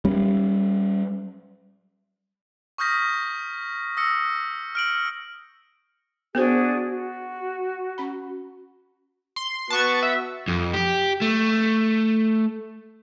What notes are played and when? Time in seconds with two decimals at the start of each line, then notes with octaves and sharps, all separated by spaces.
0.05 G3 C#4
2.78 C#6 D#6 F6 G6 A#6 B6
3.97 D#6 E6 A#6 C#7
4.75 F6 D7 F#7
6.35 B3 D4 F#4 G#4 A#4 C5
6.88 F#4
7.98 C#4 B5
9.36 C6
9.70 B3 F#4 A5 C#6
10.03 E5
10.48 F2
10.74 G4
11.22 A3